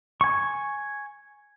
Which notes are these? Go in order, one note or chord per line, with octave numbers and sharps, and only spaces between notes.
G#5 C#6